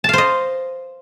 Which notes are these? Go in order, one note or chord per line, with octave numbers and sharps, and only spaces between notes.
C5 D#5 F5 A5